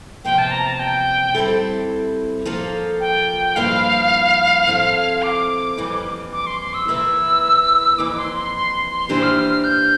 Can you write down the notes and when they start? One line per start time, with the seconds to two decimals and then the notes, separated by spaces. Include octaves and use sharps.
0.24 E2 C3 F3 A#3 G5
0.38 A5
0.51 A#5
0.66 A5
0.79 G5
1.34 G3 C4 E4 A4
2.45 F3 A#3 F4 A4
3.00 G5
3.56 G2 F3 A#3 E4 F5
4.67 F3 C4 E4 A4
5.23 D6
5.77 F2 E3 G3 A#3
6.33 D6
6.46 C6
6.60 C6
6.74 E6
6.88 E3 A#3 E4 A#4 E6
7.98 F2 E3 A#3 D6
8.17 C6
8.36 C6
8.54 C6
8.91 C6
9.09 E3 A#3 D4 G4 C5 C6
9.23 F6
9.37 F6
9.50 F6
9.64 G6